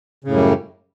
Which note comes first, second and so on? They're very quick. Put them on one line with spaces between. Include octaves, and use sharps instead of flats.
C#3 A2 F#2 G3